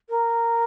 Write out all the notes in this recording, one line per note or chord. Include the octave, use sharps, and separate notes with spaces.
A#4